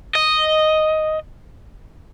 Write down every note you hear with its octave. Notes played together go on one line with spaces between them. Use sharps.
D#5